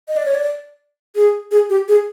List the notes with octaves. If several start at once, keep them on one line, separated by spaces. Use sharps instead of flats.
D#5
D5
C#5
D5
G#4
G#4
G4
G#4